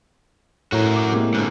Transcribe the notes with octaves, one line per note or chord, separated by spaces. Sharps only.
A2 F#4 A#4
D6
C3 G#3 A#3
G#2 D3